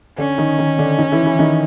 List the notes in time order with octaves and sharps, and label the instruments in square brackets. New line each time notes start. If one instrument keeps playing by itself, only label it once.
[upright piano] D3 D4 [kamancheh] C#4
[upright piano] D#3 D#4
D#3 D#4
D3 D4
D#3 D#4
E3 E4
E3 E4
D#3 D#4